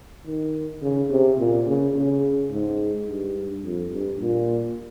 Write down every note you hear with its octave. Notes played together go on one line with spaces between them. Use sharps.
D#3
C#3
C3
A#2
C#3
C#3
G#2
G2
F2
G2
A#2